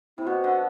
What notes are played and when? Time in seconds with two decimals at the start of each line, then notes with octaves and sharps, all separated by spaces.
0.18 C3 E4
0.27 B2 F#4
0.44 D3